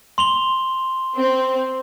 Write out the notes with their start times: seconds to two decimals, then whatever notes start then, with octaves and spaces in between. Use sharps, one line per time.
0.18 C6 F7 G7
1.17 C4